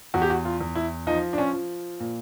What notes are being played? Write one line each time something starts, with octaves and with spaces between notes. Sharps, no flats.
E2 F#4
G4
F#4
F4
E2
E4
F3 D#4
D4
C#4
F3
A#2